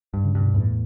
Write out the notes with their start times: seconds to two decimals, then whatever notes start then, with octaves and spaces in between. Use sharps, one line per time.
0.14 G2
0.24 C#3
0.35 G2 B2
0.54 E2 A2